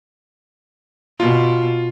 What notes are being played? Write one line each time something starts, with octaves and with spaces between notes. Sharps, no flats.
B2 F4